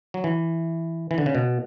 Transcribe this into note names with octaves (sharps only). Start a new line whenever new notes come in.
F#3
E3
E3
D3
C#3
B2